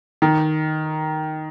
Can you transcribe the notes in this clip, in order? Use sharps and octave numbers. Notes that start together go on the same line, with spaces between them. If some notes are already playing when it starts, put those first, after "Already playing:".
D#3